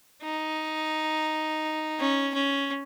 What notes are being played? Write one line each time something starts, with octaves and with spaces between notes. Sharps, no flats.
D#4
C#4
C#4